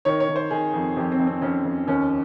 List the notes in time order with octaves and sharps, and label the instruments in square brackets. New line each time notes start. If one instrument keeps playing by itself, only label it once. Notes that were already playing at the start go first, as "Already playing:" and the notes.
[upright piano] D#3 C#5
C#5
D#3
C5
D#3 G#4
F2
F2 G4
C4
F2
C4
F2 C#4
F2
D#2 C#4